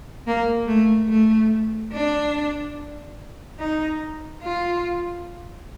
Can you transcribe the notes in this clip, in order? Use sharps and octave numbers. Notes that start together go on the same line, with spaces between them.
A#3
A3
A3
D4
D#4
F4